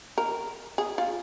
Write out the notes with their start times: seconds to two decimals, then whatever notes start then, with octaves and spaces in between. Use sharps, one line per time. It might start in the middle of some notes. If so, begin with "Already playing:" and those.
0.18 A#4
0.78 G#4
0.98 F4